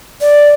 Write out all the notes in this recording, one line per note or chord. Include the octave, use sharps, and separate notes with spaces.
D5